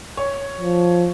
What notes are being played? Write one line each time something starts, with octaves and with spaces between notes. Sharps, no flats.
C#5
F3